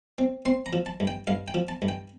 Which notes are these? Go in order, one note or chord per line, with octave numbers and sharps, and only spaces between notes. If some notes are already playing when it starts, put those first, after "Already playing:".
C4
C4 C6
A#5
F3
A5
G2
G5
G2 F5
G5
F3
A5
G2
G5